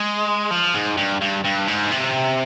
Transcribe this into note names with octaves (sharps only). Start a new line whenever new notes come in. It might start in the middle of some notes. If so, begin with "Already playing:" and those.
Already playing: G#3
F3
G#2
G2
G2
G2
G#2
C3